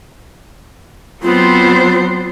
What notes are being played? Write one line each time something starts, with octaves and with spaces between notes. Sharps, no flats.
F#3 B3 C4 F4 C5